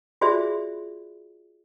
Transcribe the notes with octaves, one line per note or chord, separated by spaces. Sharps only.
F4 F#4 G#4 C5 D5 E5